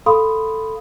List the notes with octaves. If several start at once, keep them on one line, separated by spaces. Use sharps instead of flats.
A4 F5 B5 C6 D#6